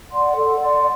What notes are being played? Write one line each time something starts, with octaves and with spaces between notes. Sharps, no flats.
D5 F#5 C6
A4
D5 F#5 C6